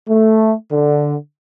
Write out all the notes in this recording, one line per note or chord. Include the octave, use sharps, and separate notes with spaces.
A3
D3